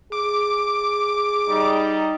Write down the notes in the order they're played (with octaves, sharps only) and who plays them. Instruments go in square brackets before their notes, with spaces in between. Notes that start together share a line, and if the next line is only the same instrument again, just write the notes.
[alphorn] G#4 [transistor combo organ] D6
[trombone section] G3 D#4